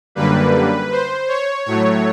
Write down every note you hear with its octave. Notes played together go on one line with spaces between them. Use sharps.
F#2 D3 G3 A#3 B4
C5
C#5
A2 F#3 A3 C#5